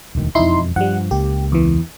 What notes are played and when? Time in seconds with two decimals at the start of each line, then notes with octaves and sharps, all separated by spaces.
0.15 E1 D2 D#3
0.35 E1 F2 D#4 E4 C6
0.76 G2 F3 G3 F#5
1.11 C#2 A#3 G4
1.52 E2 E3